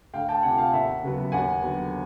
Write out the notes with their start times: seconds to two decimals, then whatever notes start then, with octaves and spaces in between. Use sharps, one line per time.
0.13 D2 F5 G5
0.29 G5 A5
0.43 C3 F3 F#5 G#5
0.58 F5 G5
0.73 D#2 E5 F#5
1.03 C#3 F#3 B3
1.32 D#2 F#5 G#5
1.62 D3 F#3 B3